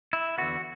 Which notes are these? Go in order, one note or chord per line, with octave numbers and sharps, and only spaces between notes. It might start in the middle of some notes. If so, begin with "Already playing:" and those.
E4
E2 D3 B3 F#4